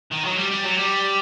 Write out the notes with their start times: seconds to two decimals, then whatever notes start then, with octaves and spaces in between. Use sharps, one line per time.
0.11 D#3
0.24 F#3
0.37 G3
0.51 G3
0.64 F#3
0.77 G3